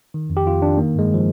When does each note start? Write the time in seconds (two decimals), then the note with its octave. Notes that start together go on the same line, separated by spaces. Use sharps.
0.14 D#3
0.30 F2
0.37 G4
0.46 F2 F4
0.62 D#3 D4
0.78 D#3 A#3
0.95 G2 G#3
1.14 F3